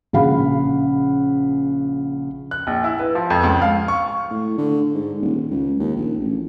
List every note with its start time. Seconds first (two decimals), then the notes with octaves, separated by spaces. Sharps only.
0.13 A#1 C#3 G#4 F5 F#5 B5
2.51 F#6
2.67 A#1
2.84 E4
3.00 B4
3.15 F3
3.30 F2
3.44 C#2
3.62 F5
3.88 C#6
4.31 A2
4.58 D3
4.94 G#2
5.21 D#1
5.50 C#2
5.79 D#2
5.96 A#1
6.21 A1